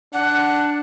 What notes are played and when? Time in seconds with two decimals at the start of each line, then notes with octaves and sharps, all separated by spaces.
0.14 D4 F#5